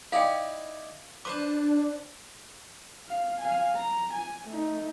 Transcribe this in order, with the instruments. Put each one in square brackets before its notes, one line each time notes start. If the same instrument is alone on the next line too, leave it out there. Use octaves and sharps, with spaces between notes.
[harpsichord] D#4 E4 D5 [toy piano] F5 G5
[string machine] D4 [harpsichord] B4 C5 A5 [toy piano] D6
[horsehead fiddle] F5
F5 G#5
A#5
G#5
A3 D#4